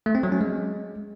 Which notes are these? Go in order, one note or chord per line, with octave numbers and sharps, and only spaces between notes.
A3
C4
F#3
C#4
G#3